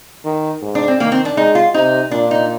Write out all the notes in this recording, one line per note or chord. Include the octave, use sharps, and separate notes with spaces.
D#3
G#2
D4
C4
D#3 A#3
C4
D4
G#3 D#4
F4
C3 D#4
A#2 D4
D#4